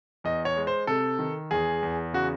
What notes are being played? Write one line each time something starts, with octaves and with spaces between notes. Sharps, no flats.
E2 D#5
C#5
G#3
C5
C3 A4
D#3
E2 G#4
E2
C#3 F#4